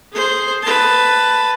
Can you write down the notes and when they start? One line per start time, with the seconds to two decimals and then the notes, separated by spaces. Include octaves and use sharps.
0.13 G#4 C5
0.63 B4 A5